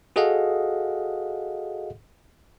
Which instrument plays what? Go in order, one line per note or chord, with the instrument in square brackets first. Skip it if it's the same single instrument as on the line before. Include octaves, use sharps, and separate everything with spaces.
[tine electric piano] F#4 G#4 A4 D#5 F5 F#5